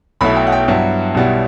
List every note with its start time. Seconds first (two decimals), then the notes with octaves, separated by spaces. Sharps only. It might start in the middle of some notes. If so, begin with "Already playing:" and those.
0.21 B1 B2 A3 E4 B5
0.36 G5
0.47 F#5
0.52 G5
0.68 G2 F#3 B3 E4
1.14 B1 B2 G3 B3 E4